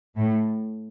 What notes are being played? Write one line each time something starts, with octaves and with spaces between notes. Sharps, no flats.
A2